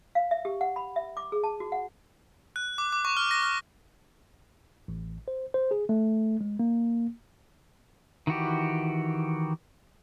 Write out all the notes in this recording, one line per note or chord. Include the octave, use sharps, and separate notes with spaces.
F5
E5
G4
F#5
B5
E5
D6
G#4
A5
F#4
F#5
F#6
D6
D6
C#6
F6
A#6
F6
A1
C5
C5
G#4
A3
G#3
A#3
D#3 E3 F#4 G4